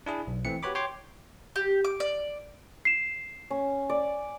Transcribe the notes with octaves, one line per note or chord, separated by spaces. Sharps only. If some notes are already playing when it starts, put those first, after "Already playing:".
D4 E4 G#4
B1
E3 A3 C4 C#7
F#4 G4 B4 C#5 B5 D6
C#5 G5 C6 D6
G4
D6
D5
C7 E7
C#4
D5